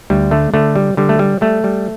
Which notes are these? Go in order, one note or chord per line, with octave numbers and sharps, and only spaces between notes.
D2 G3
D3 A3
D3 A3
G3
D3 G3
A3
G3
G3 A3
G3